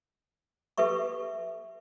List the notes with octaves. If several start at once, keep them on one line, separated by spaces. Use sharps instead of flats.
G4 A4 B4 E5 C#6